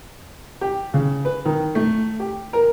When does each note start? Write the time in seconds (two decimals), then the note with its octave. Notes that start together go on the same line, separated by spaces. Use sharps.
0.61 G4
0.94 C#3
1.25 B4
1.45 D#3
1.75 A3
2.20 G4
2.53 A#4